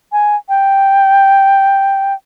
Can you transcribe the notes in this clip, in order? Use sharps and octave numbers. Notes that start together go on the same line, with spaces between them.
G#5
G5